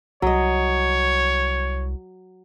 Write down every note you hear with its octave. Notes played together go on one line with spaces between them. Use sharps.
C2 F#3 C#5 D#5